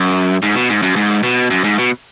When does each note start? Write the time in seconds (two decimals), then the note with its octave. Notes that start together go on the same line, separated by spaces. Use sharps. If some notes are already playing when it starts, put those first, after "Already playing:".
Already playing: F#2
0.42 G#2
0.56 B2
0.70 G#2
0.82 F#2
0.96 G#2
1.23 B2
1.50 F#2
1.64 G#2
1.78 B2